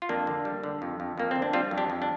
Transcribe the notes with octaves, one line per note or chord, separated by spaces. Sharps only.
F4
F2 A#3 D4
D3
G3
D3
F2
F2
F2 A#3
D3 C4
D4
G3 C4 F4
F2
D4 G4
F2
D4